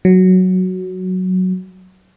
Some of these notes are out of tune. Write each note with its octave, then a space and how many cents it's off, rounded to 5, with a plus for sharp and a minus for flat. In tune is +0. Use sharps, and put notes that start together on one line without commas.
F#3 +0